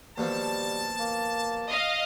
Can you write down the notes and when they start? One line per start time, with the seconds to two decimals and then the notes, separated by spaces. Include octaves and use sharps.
0.18 D#2 B2 F3 G3 A5
1.00 A#3
1.69 D#5 F5